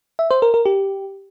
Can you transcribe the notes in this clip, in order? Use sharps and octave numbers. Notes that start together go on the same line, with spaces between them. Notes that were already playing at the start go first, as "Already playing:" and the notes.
E5
C5
A#4
A#4
G4